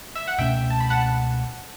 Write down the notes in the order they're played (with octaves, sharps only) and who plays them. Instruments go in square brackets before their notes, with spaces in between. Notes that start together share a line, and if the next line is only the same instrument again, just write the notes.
[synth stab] E5
F#5
[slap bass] C#2 B2 A3 C#4 [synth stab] E5 G5
[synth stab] A5
B5
F#5 A5